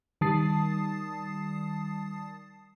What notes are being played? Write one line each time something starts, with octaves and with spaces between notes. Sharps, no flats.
D#3 G3 A5 D#6 A6 C7